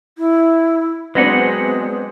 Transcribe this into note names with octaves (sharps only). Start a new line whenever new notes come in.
E4
F#3 G#3 B3 C4 D4 D#5 F#5